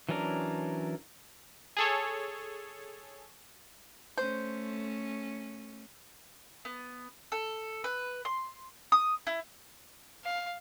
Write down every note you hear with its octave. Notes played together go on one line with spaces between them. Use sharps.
E3 F#3 C#4 D4 A#4
G#4 A4 C#5
A3 C#4 C5
B3
A4
B4
C6
D#6
E4
F5